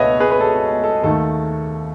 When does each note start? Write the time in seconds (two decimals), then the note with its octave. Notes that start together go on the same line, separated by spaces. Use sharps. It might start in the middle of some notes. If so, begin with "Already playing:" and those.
Already playing: C#2 B2 A3 B4 C#5 D#5 E5 F#5
0.20 G#4 B4
0.31 B4
0.40 A4
0.84 A4
1.04 D#2 D#3 A3 A4